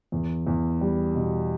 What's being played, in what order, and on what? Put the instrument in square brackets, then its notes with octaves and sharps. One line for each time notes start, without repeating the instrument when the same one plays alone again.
[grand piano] E2
E2
G3
B2